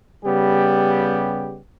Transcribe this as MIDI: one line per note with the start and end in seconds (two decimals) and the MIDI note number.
0.25 1.60 49
0.25 1.60 55
0.25 1.60 59
0.25 1.60 67